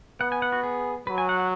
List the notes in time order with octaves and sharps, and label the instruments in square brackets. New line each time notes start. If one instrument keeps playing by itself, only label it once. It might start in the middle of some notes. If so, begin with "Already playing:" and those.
[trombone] B3 [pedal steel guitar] F#5
[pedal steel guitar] G#5
F#5
F#4
G#4
[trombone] F#3 [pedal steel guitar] B4
[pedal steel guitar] G#5
F#5
F#5